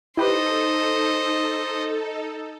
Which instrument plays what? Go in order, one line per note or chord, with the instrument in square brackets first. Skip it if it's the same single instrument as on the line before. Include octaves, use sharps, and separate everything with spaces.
[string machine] D#4 A4 [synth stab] E4 G4 B4 [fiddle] C5 D#5